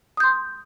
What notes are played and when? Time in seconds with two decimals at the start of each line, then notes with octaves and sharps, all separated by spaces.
0.17 D#6
0.20 G6
0.23 C6